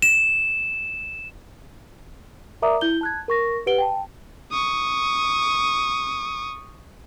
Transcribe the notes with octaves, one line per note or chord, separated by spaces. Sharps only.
E7
A#4 D5 E5 A#5 D6 D#6
E4 G6 G7
A5 F#6 G#6
A#4 C#6 A#6
G4 B4 F#5 D7 G7
G5 A5
C#6 D#6